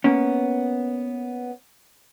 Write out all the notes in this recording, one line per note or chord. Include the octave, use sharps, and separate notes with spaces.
A#3 B3 C#4